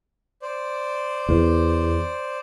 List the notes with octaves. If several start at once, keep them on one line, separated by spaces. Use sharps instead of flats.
C5 D5
E2